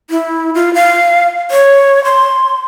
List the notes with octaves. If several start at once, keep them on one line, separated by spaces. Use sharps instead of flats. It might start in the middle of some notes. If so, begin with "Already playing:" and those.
E4
F4
F5
C#5
C6